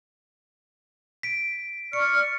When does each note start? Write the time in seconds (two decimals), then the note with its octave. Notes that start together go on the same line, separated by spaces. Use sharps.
1.23 B6 D7
1.93 D5 C#6 F6 C#7